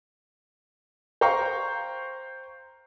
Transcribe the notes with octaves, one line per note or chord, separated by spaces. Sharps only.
C5 F5 G5 A#5 C#6